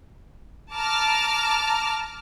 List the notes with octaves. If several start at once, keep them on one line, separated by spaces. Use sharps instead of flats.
A5 A#5 D6 F6